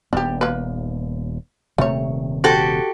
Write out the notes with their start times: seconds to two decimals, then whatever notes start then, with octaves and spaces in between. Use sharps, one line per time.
0.13 D#1 D#2 B3 D4 G4
0.41 A#3 B4
1.78 D#1 C3 D#3 A3 C#5
2.44 F#4 G4 A4 C5